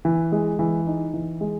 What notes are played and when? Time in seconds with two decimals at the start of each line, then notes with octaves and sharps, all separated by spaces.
0.05 E3
0.32 G#3
0.59 E3
0.87 D#4
1.14 E3
1.41 G#3